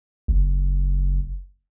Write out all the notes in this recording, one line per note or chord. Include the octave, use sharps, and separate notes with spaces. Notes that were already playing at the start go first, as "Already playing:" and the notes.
F#1